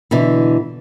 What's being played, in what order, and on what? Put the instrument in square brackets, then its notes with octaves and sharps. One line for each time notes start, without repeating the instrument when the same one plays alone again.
[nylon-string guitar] B2 D3 E3